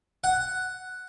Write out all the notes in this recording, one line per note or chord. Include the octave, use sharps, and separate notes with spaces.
F#5